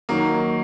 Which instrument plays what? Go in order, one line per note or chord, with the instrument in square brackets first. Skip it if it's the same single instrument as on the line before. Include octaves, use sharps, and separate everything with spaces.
[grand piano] D#3 F#3 D#4 [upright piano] A#3